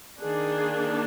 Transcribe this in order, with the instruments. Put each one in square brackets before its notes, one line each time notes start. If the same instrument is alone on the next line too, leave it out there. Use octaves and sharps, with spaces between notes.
[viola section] D#3 A#3 D4 G#4